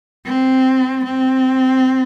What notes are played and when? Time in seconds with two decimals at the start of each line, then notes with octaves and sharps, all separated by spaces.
0.26 C4
1.05 C4